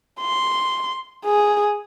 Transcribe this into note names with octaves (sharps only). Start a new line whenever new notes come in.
C6
G#4